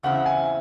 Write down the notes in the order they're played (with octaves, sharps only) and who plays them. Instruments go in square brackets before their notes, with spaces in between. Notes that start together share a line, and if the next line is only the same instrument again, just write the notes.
[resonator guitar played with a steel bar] E2 C#3 C4 E4 [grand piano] F#5
[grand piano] G#5